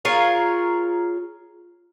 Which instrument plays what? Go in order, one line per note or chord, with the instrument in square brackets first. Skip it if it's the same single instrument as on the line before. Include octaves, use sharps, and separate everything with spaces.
[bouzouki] F4 G#4 A#4 C#5